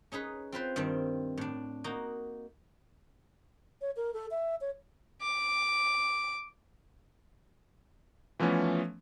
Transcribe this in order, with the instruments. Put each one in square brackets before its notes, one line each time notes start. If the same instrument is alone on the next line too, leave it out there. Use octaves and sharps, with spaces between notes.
[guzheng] C#4 D#4 G#4 B4
C4 F4 B4 C5
G2 D#3 G3 C4
A2 D4
A#3 D#4 F#4
[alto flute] C#5
A#4
A4
E5
C#5
[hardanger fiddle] D6
[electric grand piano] E3 F3 A3 B3 C#4